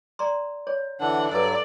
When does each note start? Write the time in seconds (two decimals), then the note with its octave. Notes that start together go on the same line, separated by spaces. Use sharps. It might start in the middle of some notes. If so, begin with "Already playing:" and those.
0.19 D5 A#5 C6
0.67 C#5
1.00 D3 E3 D4 F#5
1.31 G2 F#3 A4 B4 D5 E6